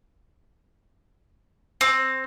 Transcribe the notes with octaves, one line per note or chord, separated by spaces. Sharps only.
C4